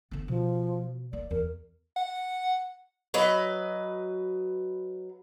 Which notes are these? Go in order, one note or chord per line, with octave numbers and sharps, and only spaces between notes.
D3 B3
B2 F3
A#3 D5
E2 A#4
F#5
F#3 B4 D#5